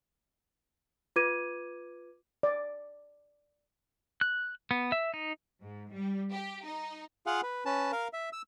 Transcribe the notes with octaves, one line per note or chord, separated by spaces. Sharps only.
F4 B4 D6 G#6 D#7
D5
F#6
B3
E5
D#4
G#2
G3
G4
D#4
F4 G#4 F5 F#5
B4
C#4 B4 A5
A#4 F5
E5
E6